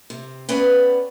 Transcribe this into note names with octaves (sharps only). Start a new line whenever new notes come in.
C3
B3 C#4 B4 D5 G5